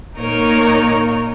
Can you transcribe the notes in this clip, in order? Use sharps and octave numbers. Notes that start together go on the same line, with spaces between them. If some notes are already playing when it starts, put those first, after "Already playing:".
A#2 A#3 D#4 A#4 C#5